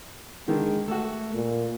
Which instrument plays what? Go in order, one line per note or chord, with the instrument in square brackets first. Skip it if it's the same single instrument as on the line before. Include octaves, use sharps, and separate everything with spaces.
[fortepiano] D3 D#3 [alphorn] G#3
[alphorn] A3 [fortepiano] F#4 A4
[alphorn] A#2